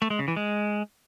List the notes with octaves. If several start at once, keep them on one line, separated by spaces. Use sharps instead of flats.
A3
G#3
C#3
E3
G#3